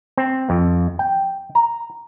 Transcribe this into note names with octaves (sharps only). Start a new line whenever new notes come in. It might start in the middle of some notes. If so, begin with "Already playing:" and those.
C4
F2
G5
A#5